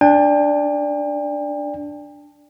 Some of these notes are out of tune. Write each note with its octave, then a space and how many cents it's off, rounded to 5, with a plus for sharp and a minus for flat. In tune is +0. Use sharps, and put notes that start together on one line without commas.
D4 +0 G5 +40